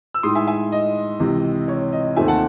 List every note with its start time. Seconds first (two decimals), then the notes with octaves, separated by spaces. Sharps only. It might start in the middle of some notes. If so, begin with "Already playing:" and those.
0.14 E6
0.23 A2 G#3 D#4 C6 D#6
0.35 E5 G#5
0.47 E5 G#5
0.72 D#5
1.20 C#2 C3 E3
1.68 C#5
1.92 D#5
2.16 D#2 D#3 A3 C4 D#4 E5 G#5
2.28 F#5 A5